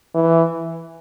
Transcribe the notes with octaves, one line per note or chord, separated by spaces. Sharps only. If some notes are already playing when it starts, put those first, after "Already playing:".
E3